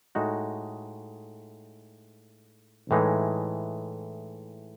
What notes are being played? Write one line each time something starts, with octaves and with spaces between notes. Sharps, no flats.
A2 G#3 D#4 F#4
A2 E3 G#3 D#4